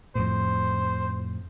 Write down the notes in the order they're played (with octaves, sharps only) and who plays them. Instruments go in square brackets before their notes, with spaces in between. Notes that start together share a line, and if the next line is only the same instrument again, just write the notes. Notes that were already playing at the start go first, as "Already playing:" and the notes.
[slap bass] F2 A2 [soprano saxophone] C5